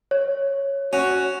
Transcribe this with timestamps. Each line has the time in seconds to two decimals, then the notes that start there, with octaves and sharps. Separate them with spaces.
0.11 C#5
0.93 C#4 F#4